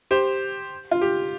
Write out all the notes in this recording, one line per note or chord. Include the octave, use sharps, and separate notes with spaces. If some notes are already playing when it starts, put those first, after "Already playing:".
G4 C5
F4
G4